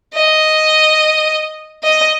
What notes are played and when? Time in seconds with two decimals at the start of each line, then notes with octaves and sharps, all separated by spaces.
0.14 D#5
1.83 D#5